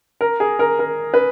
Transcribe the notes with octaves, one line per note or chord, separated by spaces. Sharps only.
A#4
G#4
A#4
A#4
B4